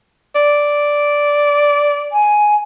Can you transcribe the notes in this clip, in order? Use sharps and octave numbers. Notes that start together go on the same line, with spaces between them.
D5
G#5